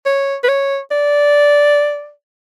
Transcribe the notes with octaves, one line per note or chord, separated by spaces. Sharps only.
C#5
B4
C#5
D5